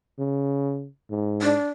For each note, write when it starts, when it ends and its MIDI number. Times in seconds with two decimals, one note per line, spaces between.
0.19 0.87 49
1.10 1.56 44
1.42 1.68 62